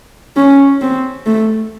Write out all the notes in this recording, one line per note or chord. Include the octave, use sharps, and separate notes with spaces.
C#4
C4
A3